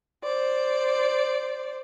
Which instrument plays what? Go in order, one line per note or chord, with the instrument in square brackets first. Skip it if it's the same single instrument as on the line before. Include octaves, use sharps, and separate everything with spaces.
[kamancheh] C5 D5